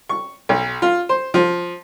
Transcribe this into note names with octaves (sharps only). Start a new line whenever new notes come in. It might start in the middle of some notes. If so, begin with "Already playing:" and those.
C#6
B1
F4
C5
F3